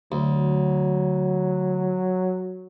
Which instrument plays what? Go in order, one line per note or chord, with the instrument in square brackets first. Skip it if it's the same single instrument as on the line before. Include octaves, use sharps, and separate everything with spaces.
[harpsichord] D2 [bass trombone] F#3